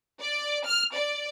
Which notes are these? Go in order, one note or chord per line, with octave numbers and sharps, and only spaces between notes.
D5
F6
D5